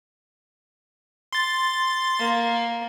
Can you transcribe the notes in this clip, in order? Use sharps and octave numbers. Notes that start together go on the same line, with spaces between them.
C6 A6
A#3